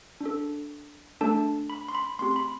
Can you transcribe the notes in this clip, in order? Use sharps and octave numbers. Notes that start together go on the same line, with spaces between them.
D4 A4
A3 D4 A4 A5
B5
C6
B5
A3 C4 G4 C6
C6
B5